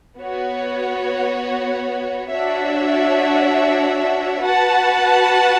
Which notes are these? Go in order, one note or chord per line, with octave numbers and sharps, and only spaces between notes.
B3 F#4 C#5
D4 F#4 C#5 E5
F#4 B4 F#5 A5